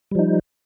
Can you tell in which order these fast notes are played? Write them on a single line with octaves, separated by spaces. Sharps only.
G3 F3 D#4